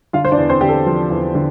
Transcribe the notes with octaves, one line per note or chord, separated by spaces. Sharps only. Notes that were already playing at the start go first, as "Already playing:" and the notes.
D3 F4 F5
C5
D4 D5
E2
C4 C5
D3 G4
A4
F3
E2
D3